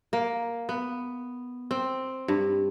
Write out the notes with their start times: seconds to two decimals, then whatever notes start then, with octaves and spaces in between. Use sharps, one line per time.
0.13 A#3
0.69 B3
1.71 C4
2.28 G2